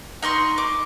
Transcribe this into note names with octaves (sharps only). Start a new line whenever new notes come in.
D#4 D#5 C6 C#6
D6